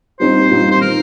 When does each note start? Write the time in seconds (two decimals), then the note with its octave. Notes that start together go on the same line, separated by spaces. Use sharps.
0.20 A#2 G3 C4 D#4 C5
0.51 A#2 G3 C4 D#4
0.71 C5
0.81 D#3 A#4